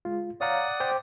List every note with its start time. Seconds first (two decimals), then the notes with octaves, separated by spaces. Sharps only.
0.05 G#3 F4
0.41 C#5 D5 F5 F#5 A#5 D#6
0.80 C5 G5 D6